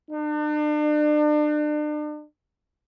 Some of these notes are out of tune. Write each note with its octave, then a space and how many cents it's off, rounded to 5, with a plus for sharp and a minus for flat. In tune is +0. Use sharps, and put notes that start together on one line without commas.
D4 +40